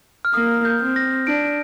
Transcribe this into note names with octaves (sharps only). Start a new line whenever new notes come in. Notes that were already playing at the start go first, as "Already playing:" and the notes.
F6
A#3 D#6
G6
C4
A#6
D4 D7